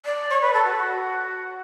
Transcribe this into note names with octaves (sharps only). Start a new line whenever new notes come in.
D5
C#5
B4
A4
F#4
F#4